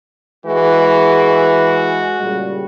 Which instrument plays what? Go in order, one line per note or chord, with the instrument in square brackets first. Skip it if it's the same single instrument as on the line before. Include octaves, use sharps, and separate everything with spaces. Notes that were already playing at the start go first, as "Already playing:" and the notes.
[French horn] E3 [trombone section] G#3 [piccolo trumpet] F#4
[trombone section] A#2 C#3 G3